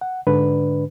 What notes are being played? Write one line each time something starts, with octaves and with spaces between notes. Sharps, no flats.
F#5
G#2 D3 D4 B4